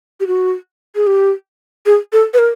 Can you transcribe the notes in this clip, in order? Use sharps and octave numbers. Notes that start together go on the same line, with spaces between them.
G4
F#4
G#4
G4
G#4
A4
B4
A#4